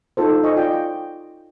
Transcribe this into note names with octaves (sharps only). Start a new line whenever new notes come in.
D#4 F4 A4 C5
D#5 G#5 C#6
F4 D5 G5